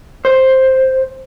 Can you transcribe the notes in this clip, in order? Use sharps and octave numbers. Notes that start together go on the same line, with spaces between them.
C5